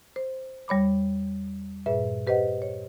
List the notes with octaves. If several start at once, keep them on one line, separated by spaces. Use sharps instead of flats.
C5
E2 G3 C#5 B5 D6
G2 A#2 G#4 B4 E5
G4 B4 C5 D#5 F#5
C#5